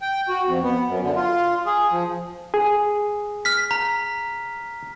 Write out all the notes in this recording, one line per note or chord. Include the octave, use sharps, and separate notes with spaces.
G5
F#4
F2
B3
F#2
D3
F4
G#4
F3
G#4
F6 B6
A#5